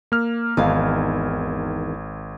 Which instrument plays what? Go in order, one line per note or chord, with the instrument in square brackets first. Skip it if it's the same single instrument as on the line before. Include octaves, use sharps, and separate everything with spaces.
[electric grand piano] A#3 F6
[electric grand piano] G#1 [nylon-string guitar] E2 D#3 F5